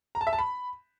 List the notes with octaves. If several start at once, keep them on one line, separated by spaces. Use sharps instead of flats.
A#5
A5
E5
A5
B5